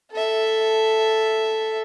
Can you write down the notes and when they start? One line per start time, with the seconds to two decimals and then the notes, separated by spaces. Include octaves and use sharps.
0.11 A4 E5